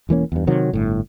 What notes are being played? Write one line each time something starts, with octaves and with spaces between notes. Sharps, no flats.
E1 E3 A#3 C#4
E2 G2
C3 D#3 F#3
G1 A2